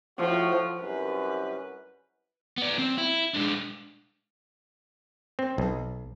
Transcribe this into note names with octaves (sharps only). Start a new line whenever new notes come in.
A2 F3 F#4
C2 F#2 B4
B3 D5
C4
E4
G#3 D4
C4
B1